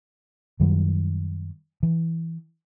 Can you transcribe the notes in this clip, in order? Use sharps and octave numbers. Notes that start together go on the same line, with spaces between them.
F#2 D#3 F#3 G3
E3